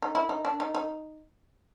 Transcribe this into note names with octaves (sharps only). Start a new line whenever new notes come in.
D#4
E4
D#4
D4
D#4
D#4